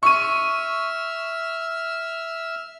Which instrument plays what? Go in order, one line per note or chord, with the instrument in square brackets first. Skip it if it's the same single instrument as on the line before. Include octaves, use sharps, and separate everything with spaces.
[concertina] E5 E6 F6 [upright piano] C#6 D#7